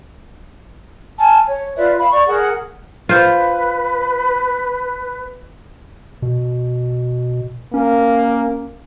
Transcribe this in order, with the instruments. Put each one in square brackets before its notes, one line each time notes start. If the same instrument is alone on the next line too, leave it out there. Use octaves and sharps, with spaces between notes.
[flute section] G#5 A5 F6
C#5
F4 B4 D5 E5
F5 B5
D5 C#6
G#4 A#4 F#5
[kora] F4 C5 [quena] B4
[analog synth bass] B2
[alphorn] A#3 [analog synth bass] C#4